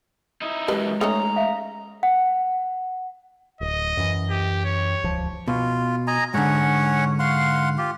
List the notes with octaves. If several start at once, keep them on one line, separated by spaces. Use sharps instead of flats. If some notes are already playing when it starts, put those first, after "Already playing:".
D#4 E4
F#2 E3 G#3 G4 B4 D#5
A3 C#4 D#4 A#5 D#6
E5 F5
F#5
D1 D#5
F#2 E3
G4
C#5
D#1 C#2 F3
B2 F4
D#5 G#5 A#5
G#2 D3 C#4 C#5 F#5
F5 F#5 C6
F4 G4